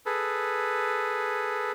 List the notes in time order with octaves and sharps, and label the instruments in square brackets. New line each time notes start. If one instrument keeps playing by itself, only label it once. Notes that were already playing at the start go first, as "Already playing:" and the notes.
[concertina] G#4 A4 B4